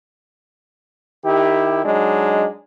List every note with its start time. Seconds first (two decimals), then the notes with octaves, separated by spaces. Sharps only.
1.24 D#3 E4 G4
1.84 F#3 G#3 D4 D#4